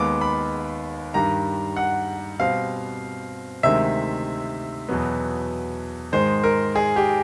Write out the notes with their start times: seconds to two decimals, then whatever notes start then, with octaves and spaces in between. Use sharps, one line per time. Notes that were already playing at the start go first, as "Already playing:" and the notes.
Already playing: D#2 D#3 G#3 B3 D6
0.21 B5
1.14 G2 D#3 G3 A#5
1.77 F#5
2.39 B2 G3 C4 F5
3.63 D2 C3 D#3 G#3 E5
4.89 E2 B2 F#3 B3
6.12 G#2 D#3 G#3 C5
6.44 A#4
6.76 G#4
6.96 G4